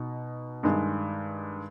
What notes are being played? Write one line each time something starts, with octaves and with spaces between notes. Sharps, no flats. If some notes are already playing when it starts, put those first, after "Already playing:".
Already playing: B2 D#4
G2 D#3 G#3